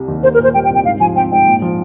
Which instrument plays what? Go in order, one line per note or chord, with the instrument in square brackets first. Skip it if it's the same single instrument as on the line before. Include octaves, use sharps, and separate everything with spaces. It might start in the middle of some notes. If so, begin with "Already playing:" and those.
Already playing: [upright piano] C2 G3
D#2
[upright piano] A#3 [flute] C5
[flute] A#4
[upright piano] A#2
[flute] C5
[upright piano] G3 [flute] G5
[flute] G5
[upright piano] C2
[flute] G5
[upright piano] G#2 [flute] F5
[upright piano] F3 [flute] G#5
[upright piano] C4 [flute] G5
[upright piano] G#2 [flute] G5
[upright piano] A#2
F3